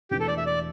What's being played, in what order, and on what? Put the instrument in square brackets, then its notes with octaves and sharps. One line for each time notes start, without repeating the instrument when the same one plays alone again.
[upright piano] E1 E2 E3 A3 D4 [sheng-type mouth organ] G4
[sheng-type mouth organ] A4
D5
E5
D5